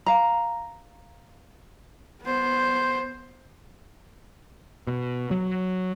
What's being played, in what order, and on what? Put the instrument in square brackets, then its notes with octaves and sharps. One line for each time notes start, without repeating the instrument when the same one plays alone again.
[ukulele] F5 A#5
[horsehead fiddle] B3 C5
[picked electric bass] B2
F#3